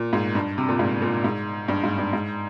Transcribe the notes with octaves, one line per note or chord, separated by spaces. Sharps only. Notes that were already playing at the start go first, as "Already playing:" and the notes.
Already playing: A#2
G#2
G2
C3
A#2
G#2
A#2
G#2
G2
G#2
G2
G#2